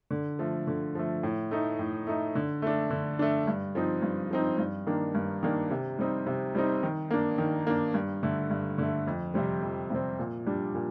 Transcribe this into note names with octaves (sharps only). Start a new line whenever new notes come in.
D3
F3 A3
D3
F3 A3
A2
A3 D#4
A2
A3 D#4
D3
A3 D4
D3
A3 D4
G2
F3 C4 D#4
G2
F3 C4 D#4
G2
D#3 A#3 D4
G2
D#3 A#3 D4
C3
G3 C4 D#4
C3
G3 C4 D#4
D#3
A#3 D4
D#3
A#3 D4
G2
D3 A3
G2
D3 A3
F2
C3 G3 C4
F2
C3 G3 C4
A#2
G3 D4
A#2